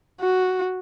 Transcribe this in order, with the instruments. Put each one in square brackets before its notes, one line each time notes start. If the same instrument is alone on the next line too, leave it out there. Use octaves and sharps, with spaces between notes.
[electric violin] F#4